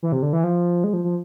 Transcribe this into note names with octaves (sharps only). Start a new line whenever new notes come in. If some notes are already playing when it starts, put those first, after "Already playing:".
E3
C3
D3
E3
F3
G#3
F3
F3